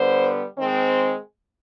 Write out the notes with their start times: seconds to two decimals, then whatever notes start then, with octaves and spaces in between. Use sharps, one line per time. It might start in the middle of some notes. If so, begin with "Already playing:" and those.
Already playing: D3 G3 B3 C5
0.57 D#3 G#3 C4